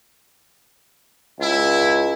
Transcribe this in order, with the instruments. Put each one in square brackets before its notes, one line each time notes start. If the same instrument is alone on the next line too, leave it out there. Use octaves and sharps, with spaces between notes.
[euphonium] C#2 [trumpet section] E4